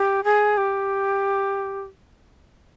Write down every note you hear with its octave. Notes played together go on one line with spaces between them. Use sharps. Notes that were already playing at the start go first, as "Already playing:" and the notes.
Already playing: G4
G#4
G4